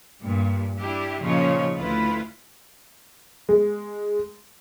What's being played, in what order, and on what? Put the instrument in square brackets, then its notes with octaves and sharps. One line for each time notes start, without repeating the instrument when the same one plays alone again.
[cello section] G2 A#2
G3 D4 E4 G4
A#2 C#3 F3 D#4 F4 C#5
D2 E4 F4 B4
[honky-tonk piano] G#3